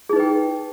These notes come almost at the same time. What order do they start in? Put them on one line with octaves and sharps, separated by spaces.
G#4 D#4 B4 G5